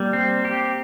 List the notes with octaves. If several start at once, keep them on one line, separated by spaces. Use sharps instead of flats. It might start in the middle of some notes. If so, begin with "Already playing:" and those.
Already playing: G3 A#3
C4
G4